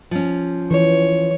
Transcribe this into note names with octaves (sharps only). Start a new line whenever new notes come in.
F3 C#4
E3 C#5